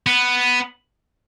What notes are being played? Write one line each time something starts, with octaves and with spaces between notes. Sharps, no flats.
B3